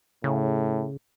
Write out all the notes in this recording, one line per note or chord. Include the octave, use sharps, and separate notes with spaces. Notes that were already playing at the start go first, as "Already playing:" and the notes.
A2 C#3